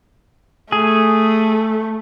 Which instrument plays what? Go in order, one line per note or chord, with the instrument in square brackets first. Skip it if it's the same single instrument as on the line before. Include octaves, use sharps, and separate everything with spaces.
[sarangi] A3 [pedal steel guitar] G#4